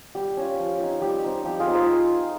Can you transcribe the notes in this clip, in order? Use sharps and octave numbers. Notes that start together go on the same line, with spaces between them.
G3 G4
C#4 F4
F3
C4 D#4
G3 G4
C4 D#4
F3 G4
F4 G#4
C4 D#4
G#4 C5